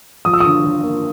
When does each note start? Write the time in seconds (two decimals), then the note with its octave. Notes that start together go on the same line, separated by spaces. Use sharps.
0.25 F3 D#6
0.34 E6
0.40 D3 D#6
0.64 D3
0.83 A#3